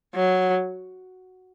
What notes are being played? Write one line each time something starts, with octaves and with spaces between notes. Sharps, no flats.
F#3